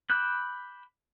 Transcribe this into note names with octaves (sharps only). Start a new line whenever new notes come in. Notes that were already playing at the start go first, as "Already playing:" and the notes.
B5 D6 E6 F#6 G6